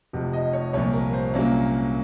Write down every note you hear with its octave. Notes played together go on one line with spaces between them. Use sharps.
F1 F2 C3
D#5
C#5
C2 A#2 F3 C#5
A#4
C5
C2 A#2 F#3 A#3 C#4